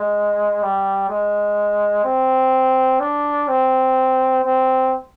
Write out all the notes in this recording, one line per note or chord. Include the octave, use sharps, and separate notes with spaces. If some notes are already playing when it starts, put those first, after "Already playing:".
Already playing: G#3
G3
G#3
C4
D4
C4
C4